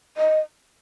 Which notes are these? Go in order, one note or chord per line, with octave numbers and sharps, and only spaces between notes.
D#5